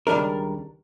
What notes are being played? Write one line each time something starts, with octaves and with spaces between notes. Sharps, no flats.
C#2 D#3 G3 D4 A#4